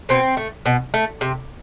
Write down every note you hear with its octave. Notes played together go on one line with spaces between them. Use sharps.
B2 C4
A3
B2
A3
C3